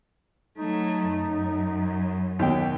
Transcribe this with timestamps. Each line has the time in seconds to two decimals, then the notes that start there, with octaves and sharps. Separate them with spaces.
0.58 F#3 A3 D#4
1.11 F#2
2.39 D#2 B2 G5